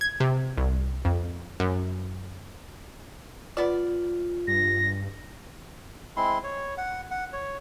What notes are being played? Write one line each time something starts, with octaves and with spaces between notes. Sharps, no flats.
G#6
C3
C2
F2
F#2
B3 F4 D5
G2 A#6
G#3 C4 E4 C6
C#5
F#5
F#5
C#5